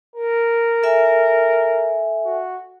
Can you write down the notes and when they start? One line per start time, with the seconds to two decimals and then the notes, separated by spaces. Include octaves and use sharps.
0.16 A#4
0.83 A4 E5 G#5
2.25 F#4